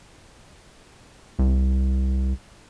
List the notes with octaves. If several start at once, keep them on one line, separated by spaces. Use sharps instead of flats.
C2